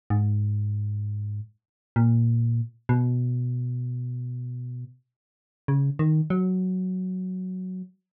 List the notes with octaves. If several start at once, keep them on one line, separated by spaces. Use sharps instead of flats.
G#2
A#2
B2
C#3
D#3
F#3